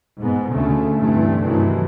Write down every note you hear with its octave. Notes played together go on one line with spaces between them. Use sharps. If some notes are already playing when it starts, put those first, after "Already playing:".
G#2 B3
D2 C#3 A3
G2 C3 E3 A3
G2 C3 D#3 E3 F#3 A3